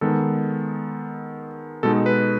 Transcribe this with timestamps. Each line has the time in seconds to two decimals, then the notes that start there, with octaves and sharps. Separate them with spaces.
0.01 D#3 G#3 B3 A4
1.83 B2 G#3 D#4 A4
2.06 B4